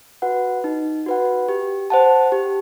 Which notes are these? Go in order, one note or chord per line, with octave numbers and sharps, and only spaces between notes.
F#4 B4 F#5
D#4
F#4 B4 F#5
G4
C5 F#5 A5
G4